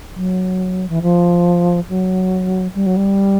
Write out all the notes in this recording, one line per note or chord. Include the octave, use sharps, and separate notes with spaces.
F#3
E3
F3
F#3
G3
F#3
G3